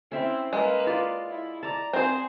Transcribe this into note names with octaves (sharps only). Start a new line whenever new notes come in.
C4 C#4 E4 E5
G#3 A#3 B4
F4 D5 F5
E4
D5 A5 A#5
C4 G#4 C5